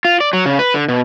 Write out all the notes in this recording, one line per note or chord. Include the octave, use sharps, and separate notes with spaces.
F4
D5
F#3
C#3
B4
D3
B2